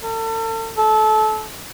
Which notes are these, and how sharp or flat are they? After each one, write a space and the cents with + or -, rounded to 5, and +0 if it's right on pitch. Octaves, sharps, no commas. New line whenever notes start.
A4 +40
A4 -25